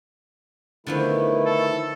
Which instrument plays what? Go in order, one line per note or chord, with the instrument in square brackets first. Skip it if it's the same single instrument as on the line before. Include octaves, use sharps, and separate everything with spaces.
[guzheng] D3 F3 B3 [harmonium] D#3 A3 E4
[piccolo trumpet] A4